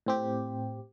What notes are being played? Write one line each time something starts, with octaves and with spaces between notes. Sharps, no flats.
A2 C4 G4